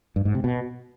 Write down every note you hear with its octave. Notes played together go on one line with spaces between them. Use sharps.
G2
G#2
C3
B2